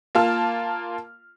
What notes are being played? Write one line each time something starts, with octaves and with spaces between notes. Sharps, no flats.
A#3 F4 A5 F6